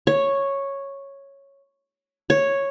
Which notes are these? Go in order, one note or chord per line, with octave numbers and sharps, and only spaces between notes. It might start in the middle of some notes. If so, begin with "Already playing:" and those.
C#5
C#5